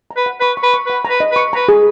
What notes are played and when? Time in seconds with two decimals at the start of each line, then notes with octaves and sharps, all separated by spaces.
0.11 A#5
0.17 B4
0.26 F#5
0.41 B4 C#6
0.57 C#6
0.63 B4
0.74 C#6
0.86 B4 F#5
1.05 A#5
1.10 B4
1.20 D#5
1.32 B4 C#6
1.53 B4 A#5
1.69 G#4